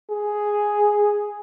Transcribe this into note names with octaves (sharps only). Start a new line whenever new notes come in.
G#4